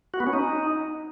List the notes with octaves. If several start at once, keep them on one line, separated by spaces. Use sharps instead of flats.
F#4
B3
C#4
D#4